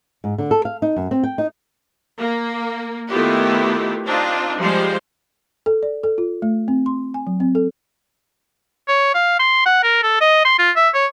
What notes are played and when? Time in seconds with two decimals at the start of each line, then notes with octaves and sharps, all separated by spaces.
0.24 G#2
0.38 D3
0.51 A4
0.65 F5
0.82 D#4
0.96 F#2
1.11 C4
1.23 G5
1.38 D#4
2.18 A#3
3.09 D#3 A3 B3 E4 F4 G4
4.04 C4 D4 D#4 F4
4.57 F3 G3 G#3 C5
5.66 A4
5.83 D5
6.04 A4
6.18 F4
6.42 A3
6.68 C4
6.86 C6
7.14 G#5
7.27 F#3
7.40 C4
7.55 A4
8.88 C#5
9.15 F5
9.39 C6
9.66 F#5
9.83 A#4
10.03 A4
10.21 D#5
10.45 C6
10.59 F4
10.76 E5
10.94 C#5